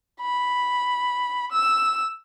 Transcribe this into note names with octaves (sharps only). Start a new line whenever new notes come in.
B5
E6